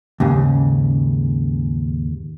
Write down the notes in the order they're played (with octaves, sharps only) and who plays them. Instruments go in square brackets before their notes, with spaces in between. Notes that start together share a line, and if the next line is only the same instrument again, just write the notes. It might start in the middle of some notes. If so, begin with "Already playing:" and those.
[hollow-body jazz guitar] D#2 G#2 C#3